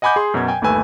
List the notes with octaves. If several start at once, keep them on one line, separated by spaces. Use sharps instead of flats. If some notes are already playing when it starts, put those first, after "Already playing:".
D#5 F#5 G#5 B5 D6 G6
G#4 C6
F#2 B2 F#3 G#6
G5 G#5 G#6
G1 D#2 A3 B4 G#5 E6